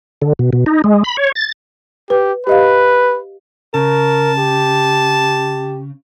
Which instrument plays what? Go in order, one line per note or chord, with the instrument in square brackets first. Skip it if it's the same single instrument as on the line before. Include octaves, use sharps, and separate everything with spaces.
[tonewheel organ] D3
B2
B2
D#4
G#3
B5
C#5
A6
[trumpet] G4 [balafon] B4
[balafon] G4 D#5 F5 [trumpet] B4
[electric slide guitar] C#3 [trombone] A#4 [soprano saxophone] A5
[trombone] G4